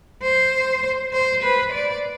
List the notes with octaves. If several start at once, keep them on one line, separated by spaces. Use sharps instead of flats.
C5
C5
B4
D5